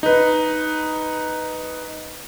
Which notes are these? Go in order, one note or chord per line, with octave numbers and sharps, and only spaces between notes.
D#4 B4